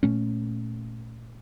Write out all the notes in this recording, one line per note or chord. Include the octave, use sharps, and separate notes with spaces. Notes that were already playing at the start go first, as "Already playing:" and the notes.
A#2 A3 C#4